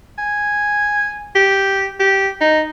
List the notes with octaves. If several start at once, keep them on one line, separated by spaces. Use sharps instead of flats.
G#5
G4
G4
D#4